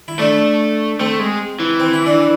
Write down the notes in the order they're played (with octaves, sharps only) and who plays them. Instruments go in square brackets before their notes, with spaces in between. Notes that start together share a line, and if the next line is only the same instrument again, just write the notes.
[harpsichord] E4
[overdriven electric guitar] A3 [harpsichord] D4
[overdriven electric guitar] A3 [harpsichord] C4
[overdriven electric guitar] G#3
E3
[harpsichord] C4
E4
D4